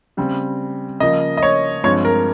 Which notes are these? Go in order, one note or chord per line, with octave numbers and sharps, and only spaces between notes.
C#3 G3 C4
C#3 F3 A#3 D#5
D#5
C#5
G2 F3 G#3 C4 C#5
A#4